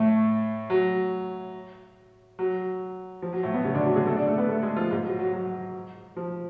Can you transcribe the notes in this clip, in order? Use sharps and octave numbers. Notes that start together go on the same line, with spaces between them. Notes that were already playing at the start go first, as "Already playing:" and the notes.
Already playing: A2 A3
F#3
F#3
F3
F#3
A2 A3
B2 B3
C#3 C#4
D3 D4
F#3 F#4
G#3 G#4
A3 A4
D4 D5
A3 A4
B3 B4
A3 A4
G#3 G#4
F3 F4
G#2 G#3
F#3
F#3
F#3
F3